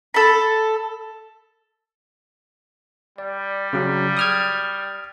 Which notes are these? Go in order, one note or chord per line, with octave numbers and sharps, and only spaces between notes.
A4 B5
G3 D5
C#3 F#3 C#4
D#6 F6 G#6